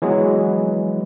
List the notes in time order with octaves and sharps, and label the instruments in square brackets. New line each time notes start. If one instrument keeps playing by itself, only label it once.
[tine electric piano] E3 F#3 G#3 B3